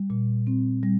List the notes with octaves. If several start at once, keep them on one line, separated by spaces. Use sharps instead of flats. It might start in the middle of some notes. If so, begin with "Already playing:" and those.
Already playing: G3
A#2
C4
G3